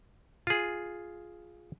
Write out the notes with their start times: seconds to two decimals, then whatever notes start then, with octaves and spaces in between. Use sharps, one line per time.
0.47 F4 G#4